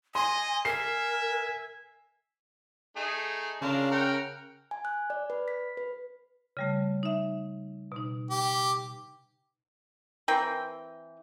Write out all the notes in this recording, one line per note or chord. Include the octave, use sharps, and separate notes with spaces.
D#5 G#5 C6
A#4 E5 G#5 C7
A3 D#4 G#4
C#3 D4 F4 A#4
A#4 F#5 G5
G#5
F#6
D5
B4
B6
B4
C#3 G3 A3
D#4 E5
B2 D#4
G4
E3 C4 A#4 G5